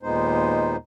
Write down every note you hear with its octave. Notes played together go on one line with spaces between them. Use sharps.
D#2 A#2 G#3 B3 D#4 C5